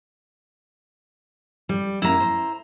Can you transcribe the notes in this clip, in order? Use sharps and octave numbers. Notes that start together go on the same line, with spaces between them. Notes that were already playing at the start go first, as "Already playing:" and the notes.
G3
F#2 A#3 E4 A#5
C5